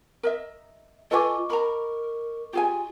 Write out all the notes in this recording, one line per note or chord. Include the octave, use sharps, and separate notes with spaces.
A#4 D#5 E5
F4 A4 B4 D#5 G#5 C#6 D6
A#4 A#5 B5
F4 G4 G#4 G#5